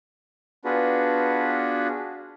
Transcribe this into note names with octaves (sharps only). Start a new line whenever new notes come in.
B3 D4 F4 F#4 G#4 B4